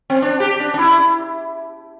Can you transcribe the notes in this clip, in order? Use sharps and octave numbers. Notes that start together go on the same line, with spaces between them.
C4
D4
G4
D4
D4
E4